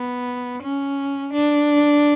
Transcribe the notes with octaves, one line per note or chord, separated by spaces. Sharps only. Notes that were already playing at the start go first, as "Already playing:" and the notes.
Already playing: B3
C#4
D4